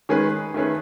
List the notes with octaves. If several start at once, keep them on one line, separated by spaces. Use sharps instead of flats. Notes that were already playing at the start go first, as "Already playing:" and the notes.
D#3 G#3 C#4 G#4 B4
D#3 A3 C#4 G#4 B4